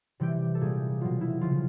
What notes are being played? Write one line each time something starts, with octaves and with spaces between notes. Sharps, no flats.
C3 E3 G3 G4
A4
A#2 G3 G#4
B2 F#3 F4
E4
C#3 F3 F4